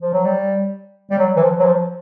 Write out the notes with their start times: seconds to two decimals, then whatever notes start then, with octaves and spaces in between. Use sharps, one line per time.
0.02 F3
0.13 F#3
0.24 G3
1.11 G3
1.18 F#3
1.36 E3
1.42 F3
1.59 F#3
1.65 F3